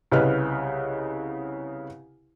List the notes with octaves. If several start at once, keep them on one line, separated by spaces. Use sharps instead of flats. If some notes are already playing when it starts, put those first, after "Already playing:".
C2 C#3 B4 D#5 F6